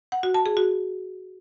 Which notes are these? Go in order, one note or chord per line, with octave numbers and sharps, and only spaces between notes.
F#5
F#4
A5
G#4
F#4